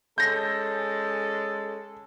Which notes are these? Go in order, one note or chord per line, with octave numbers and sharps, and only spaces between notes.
G#3 C#4 A4 G6 A#6